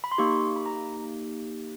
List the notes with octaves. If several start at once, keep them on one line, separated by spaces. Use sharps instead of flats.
B5
C6
A#3 D#4 G4 C#6
B5
A#5